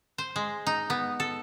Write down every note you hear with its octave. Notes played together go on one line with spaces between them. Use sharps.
C5
G#3
D#4
B3
A4